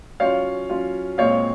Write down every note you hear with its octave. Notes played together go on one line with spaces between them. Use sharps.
F#3 C#4 F4 C#5 F5
F#3 C#4 F4
A#2 G#3 C4 C#5 F5